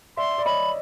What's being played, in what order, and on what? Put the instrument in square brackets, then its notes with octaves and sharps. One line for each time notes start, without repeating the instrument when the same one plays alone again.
[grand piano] D5 E5 [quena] C6
[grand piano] D5
[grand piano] C#5 D#5 [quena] B5